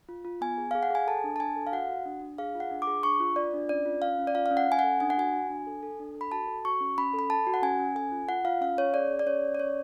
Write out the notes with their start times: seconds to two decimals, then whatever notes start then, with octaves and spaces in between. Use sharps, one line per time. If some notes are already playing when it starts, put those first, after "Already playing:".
0.09 F4
0.25 F4
0.41 B3 G#5
0.58 G#4
0.71 G#4 F5
0.83 F#5
0.90 G#4 G#5
1.07 A4 A5
1.24 D4
1.36 A5
1.40 D4 G#5
1.56 A4
1.67 F5
1.72 F#4 F#5
1.89 F#4
2.05 D4
2.21 D4
2.38 G#4 F5
2.55 F4
2.60 F#5
2.71 D4
2.82 D6
2.87 G#4
3.03 D4 C#6
3.20 F4
3.36 F4 D5
3.54 D4
3.69 C#4 D5
3.86 F4
4.02 C#4 F5
4.19 C#4
4.27 D5
4.35 F4 F5
4.46 F5
4.51 C#4
4.57 F#5
4.68 C#4 G#5
4.79 A4 F#5
5.00 D4 G#5
5.10 F#5
5.18 F#4 G#5
5.33 F#4
5.50 D4
5.67 A4
5.83 A4
6.00 D4
6.15 A4
6.21 B5
6.32 F#4 A5
6.48 A4
6.65 F#4 C#6
6.81 C#4
6.98 C#4 B5
7.14 A4
7.19 B5
7.30 A4 A5
7.47 F#4
7.54 F#5
7.62 C#4 G#5
7.79 C#4
7.95 A4 G#5
8.12 F4
8.29 F4 F#5
8.45 F4 F5
8.61 C#4 F5
8.77 C#4 C#5
8.94 G#4 D5
9.11 G#4
9.19 D5
9.26 C#4 C#5
9.43 C#4
9.55 D5
9.59 C#4 C#5